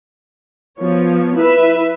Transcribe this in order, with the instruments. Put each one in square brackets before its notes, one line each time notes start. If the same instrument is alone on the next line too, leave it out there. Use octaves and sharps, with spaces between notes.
[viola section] F3 B3 C#5
[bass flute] E4 [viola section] B4 E5